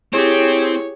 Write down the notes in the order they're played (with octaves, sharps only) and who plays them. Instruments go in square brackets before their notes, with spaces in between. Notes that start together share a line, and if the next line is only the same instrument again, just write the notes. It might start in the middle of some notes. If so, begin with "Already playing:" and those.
[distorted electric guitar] C4 [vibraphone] E4 [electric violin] G4 G#4 [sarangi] C#5